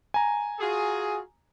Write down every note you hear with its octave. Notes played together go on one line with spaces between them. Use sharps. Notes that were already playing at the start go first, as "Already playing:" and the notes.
G#5 A#5
F4 F#4 G#4